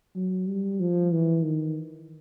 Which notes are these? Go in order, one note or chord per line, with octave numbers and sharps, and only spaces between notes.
F#3
G3
F3
E3
D#3